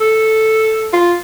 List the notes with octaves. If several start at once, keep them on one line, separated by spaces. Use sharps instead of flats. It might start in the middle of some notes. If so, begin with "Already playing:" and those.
A4
F4